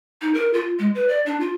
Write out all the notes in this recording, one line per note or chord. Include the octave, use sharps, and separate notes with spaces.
D#4
A#4
F4
G#3
B4
D5
D4
F4